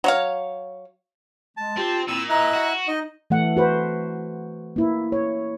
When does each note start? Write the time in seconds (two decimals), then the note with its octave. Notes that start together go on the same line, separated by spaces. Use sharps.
0.04 F#3 C#5 F5
1.57 G#3 A5
1.77 C4 F4 G4
2.08 A#2 C4 E4 E6
2.30 E4 D#5 A#5 F#6
2.54 F#4
2.88 D#4 D#5
3.30 E3 A3 F#5
3.57 F#4 B4 C5
4.76 A#3 E4
5.12 C#5